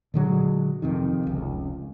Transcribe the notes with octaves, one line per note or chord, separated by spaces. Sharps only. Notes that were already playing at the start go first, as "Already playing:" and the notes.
A#2 D3 F#3 G#3
F2 C3 D#3
F1 C#2